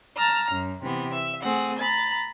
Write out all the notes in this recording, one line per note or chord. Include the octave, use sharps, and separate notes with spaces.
A5 A#5 F6
F#2
C3 E3 B3
E5
A3 C4 G#4 F#5
A#5 B5 A6